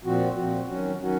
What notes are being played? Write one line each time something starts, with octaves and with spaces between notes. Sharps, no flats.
A#2 F3 C4 F#4
A#2 F3 C4 F#4
D#3 F#3 C#4 F#4
D#3 F#3 C#4 F#4